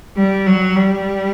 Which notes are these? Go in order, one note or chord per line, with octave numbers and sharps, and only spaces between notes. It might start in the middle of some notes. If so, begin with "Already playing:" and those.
G3
F#3
G3